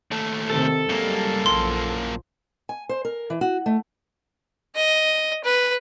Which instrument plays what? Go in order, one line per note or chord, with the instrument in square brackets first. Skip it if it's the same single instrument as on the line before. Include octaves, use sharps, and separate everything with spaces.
[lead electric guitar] D#2 A3
[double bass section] C3 D#3 C4 [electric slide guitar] A4
[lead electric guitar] F#2 A#3 [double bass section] G3 G#3
[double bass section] A#1 F3 [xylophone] C6
[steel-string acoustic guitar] G#5
C5
A#4
E3
F#4
A3
[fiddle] D#5
B4